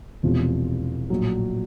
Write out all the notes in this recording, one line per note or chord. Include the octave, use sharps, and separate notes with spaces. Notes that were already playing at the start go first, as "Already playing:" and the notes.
E1 E2 C3 F3
A#1 A2 F#3